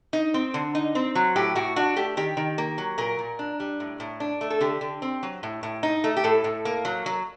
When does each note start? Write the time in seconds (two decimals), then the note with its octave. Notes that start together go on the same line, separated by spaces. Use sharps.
0.13 D#4
0.34 C4
0.54 D3
0.75 D#4
0.95 C4
1.15 F#3
1.36 A2 G4
1.55 A2 F#4
1.76 D4 F#4
1.96 A3 G4
2.17 D#3 G4
2.37 D#3
2.58 A#3
2.78 F#3
2.98 A#2 A#4
3.19 A#2
3.39 D4
3.60 G3
3.80 A2
4.00 A2
4.20 D4
4.41 A3
4.50 A4
4.61 D3 G4
4.81 D3
5.02 C4
5.23 F#3
5.43 A2
5.63 A2
5.83 D#4
6.04 A3
6.17 G4
6.24 A2 A4
6.44 A2
6.65 A#3
6.85 F#3
7.06 F#3